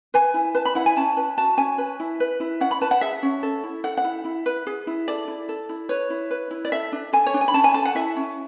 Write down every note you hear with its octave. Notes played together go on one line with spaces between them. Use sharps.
B4 G#5
E4
B4 A5
B5
E4 F#5
G#5
C#4 A5
B4
F#4 A5
C#4 G#5
B4
E4
B4
E4
C#4 F#5
B5
B4 A5
F#5
G#4 E5
C#4
A4
E4
A4 F#5
F#5
E4
E4
B4
G#4
E4
A4 D5
E4
A4
E4
B4 C#5
E4
B4
E4
D5
A4 E5
D4
A4 G#5
C#5
D4
G#5
B5
C#4 A5
G#5
A4 A5
F#5
E4 E5
C#4